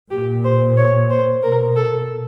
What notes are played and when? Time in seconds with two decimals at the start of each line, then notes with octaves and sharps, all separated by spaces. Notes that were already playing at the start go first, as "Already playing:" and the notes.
0.10 A#2 G4
0.45 C5
0.77 C#5
1.10 C5
1.43 B2 A#4
1.76 A4